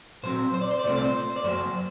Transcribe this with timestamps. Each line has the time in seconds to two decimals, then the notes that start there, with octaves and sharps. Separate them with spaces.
0.23 A#2 F#3 C4 C5
0.54 C5
0.61 D5
0.71 C5
0.79 D5
0.84 C2 A#2 A3 C4 C5
0.96 D5
1.04 C5
1.36 D5
1.44 F#2 F#3 A#3 C5